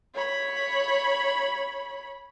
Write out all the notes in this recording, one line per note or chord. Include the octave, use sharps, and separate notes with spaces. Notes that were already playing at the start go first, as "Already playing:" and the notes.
C#5 B5